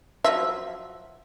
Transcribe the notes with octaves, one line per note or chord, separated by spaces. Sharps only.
F3 F#3 E5